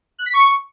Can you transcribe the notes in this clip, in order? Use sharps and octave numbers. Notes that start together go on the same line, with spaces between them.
F#6
B6
C#6